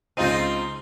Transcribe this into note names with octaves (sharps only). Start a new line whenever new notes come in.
C#2 C4 D#4 F4 D#7